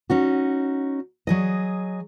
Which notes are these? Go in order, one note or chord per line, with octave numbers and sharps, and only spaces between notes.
C#4 D#4 F#4
F#3 G#4 D#5